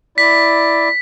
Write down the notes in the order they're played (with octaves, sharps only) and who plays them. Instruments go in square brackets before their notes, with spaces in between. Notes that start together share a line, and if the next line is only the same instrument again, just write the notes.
[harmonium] E4 D5 [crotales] B6